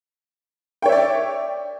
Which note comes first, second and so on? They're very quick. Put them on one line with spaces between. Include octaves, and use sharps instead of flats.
G5 C#5 E5 D5